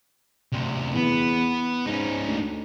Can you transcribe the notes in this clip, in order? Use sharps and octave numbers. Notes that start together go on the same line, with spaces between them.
D2 C3
E2 B3
G#2 C#4 D#4
D2